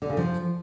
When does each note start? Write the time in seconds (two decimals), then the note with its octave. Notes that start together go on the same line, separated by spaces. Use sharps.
0.02 D3
0.09 C#3
0.17 F3